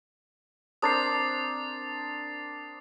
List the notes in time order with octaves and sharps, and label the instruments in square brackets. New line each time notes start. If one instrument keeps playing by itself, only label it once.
[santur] C4 D4 A#4 [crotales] D#6 A6 C7